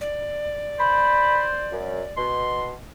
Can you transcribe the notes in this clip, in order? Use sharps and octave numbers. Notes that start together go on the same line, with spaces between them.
D5
C5 B5
F#2
B2 C6